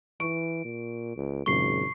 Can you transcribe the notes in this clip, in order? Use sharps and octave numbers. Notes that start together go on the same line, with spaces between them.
E3 C#6 D7
A#2
C#2
G#1 F#2 A#2 C#3 C#6 C7